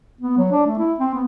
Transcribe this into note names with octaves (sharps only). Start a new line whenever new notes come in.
B3
F#3
D4
A3
E4
C4
B3